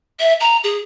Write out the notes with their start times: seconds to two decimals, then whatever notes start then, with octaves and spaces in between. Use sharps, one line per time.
0.20 E5
0.40 A#5
0.64 G#4